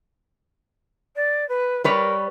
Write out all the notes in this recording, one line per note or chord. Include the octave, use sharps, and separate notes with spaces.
D5
B4
G3 A#4 B4 C#5